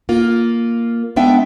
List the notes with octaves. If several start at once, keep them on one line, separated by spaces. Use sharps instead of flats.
A#3 F4
G#3 B3 D4 E5 G5